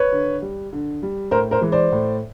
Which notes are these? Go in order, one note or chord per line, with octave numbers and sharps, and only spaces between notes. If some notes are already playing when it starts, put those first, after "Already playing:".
Already playing: B4 C#5
D3
G3
D3
G3
A2 A#4 C5
A#4 C5
E3 G#3
C5 D5
A2